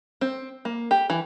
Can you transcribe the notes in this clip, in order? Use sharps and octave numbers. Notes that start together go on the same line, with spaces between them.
C4
A#3
G4
E3